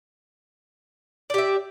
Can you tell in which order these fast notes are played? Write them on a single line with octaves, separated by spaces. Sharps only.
D5 G4 E5